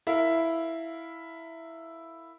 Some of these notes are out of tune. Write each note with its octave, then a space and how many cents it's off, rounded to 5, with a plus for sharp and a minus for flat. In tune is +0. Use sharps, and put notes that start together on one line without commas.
E4 +0 A#4 -25 F5 +0